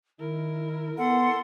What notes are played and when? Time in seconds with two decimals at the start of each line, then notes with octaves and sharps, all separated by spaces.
0.19 D#3 E4 A#4
0.97 B3 A4 F#5 C6